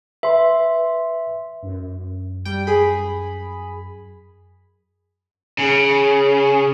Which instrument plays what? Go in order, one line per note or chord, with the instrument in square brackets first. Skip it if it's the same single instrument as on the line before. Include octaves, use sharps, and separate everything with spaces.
[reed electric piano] B4 C6 [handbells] E5
[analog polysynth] F#2
[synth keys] G3 G5
G#4 B5
[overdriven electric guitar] C#3